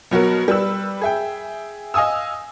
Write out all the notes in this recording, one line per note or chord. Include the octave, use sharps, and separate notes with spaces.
B2 F#3 F#4 A#4
G3 B4 E6
G#4 E5 G5
D#5 F5 G#5 D#6 E6